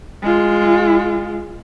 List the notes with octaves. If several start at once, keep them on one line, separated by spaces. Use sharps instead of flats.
G#3 F4